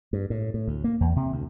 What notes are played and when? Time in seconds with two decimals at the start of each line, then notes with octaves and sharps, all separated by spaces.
0.13 G2
0.30 A2
0.54 A2
0.68 D2
0.84 A#3
1.00 E2
1.16 C3
1.32 D2